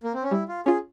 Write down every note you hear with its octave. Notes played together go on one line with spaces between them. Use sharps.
A#3
C4
C#4
G3 E4
F4
C#4 F4 G#4